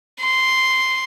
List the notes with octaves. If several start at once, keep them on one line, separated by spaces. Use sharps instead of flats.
C6